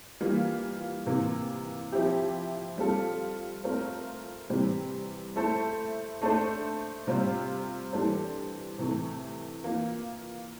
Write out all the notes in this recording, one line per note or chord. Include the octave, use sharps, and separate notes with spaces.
E3 G3 A#3 F4
C3 E3 A#3
F3 C4 E4 G4
G3 C4 F4 A4
A3 C4 F4 A#4
C3 E3 G3 C4
A3 E4 A4 C5
A3 D4 A4 C5
C3 G3 C4 F4 C5
E3 G3 D4 A4 C5
C3 E3 A3
E3 A#3 F4